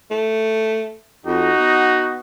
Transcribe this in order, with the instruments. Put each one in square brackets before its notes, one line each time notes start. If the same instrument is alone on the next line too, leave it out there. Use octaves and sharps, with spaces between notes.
[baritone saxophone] A3
[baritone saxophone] F2 [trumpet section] D#4 F#4
[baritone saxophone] B3